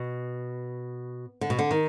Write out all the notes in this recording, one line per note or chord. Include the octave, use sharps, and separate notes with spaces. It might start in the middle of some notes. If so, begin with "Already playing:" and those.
Already playing: B2
D3
B2
D3
D#3